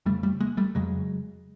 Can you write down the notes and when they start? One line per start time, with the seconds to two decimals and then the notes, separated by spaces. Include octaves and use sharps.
0.06 F2 G3 A3
0.09 C#3
0.23 G3 A3
0.40 G#3 A#3
0.57 G3 A3
0.75 F2 C#3 F#3 G#3